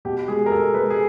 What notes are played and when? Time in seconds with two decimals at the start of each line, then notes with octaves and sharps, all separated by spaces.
0.05 B2 G4
0.28 G#3 G#4
0.46 A#4
0.52 B2 A4
0.74 G#3 B4
0.90 G#4